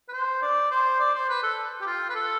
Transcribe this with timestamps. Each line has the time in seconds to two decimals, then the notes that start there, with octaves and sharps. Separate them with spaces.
0.09 B4
0.13 C5
0.42 D5
0.71 C5
1.00 D5
1.15 C5
1.29 B4
1.43 A4
1.81 G4
1.87 F4
2.10 B4
2.15 A4